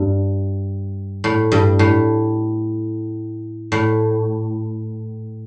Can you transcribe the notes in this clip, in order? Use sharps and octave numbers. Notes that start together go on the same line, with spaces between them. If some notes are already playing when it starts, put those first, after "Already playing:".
Already playing: G2
A2
G2
A2
A2